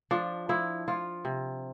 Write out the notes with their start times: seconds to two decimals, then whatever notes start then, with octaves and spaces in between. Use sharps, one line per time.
0.11 F3 D4
0.49 F3 E4
0.88 F3 F4
1.25 C3